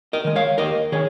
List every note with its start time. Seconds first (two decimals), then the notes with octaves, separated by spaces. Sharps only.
0.13 A#4 D#5
0.24 D#3 G#3
0.36 C#5 F5
0.58 D#2 A#4 D#5
0.92 D#3 G#4 C#5